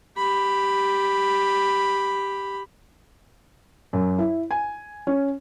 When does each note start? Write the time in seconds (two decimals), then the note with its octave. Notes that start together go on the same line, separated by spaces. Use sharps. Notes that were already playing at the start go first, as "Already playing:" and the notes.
0.17 G4 B5
3.93 F#2
4.18 E4
4.51 G#5
5.07 C#4